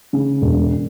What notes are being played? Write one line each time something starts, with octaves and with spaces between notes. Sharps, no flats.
C#3
E1